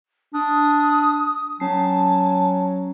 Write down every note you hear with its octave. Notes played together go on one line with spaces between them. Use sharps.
D4 D#6
F#3 C#4 G#5 A5 C7